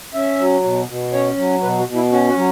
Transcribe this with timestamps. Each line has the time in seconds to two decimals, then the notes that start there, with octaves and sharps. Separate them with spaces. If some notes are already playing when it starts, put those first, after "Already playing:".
0.14 C#4 E5
0.39 F#3
0.64 B2
0.88 B2
1.13 C#4 C#5
1.37 F#3
1.63 B2 B4
1.79 F#4
1.88 B2
1.95 E4
2.12 C#4 F#4
2.29 F#4
2.36 F#3